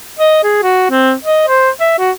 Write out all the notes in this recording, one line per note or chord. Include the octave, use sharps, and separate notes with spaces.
D#5
G#4
F#4
C4
D#5
C5
E5
F#4